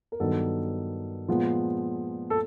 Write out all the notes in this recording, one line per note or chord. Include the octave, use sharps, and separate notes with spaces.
A#4
G2 D#3 F#3 B3 A4
A#2 F3 G#3 B3
A4